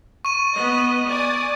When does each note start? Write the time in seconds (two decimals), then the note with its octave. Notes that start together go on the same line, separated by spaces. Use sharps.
0.25 C#6 D#7
0.54 B3 D#5
1.08 D5 G#5 D#6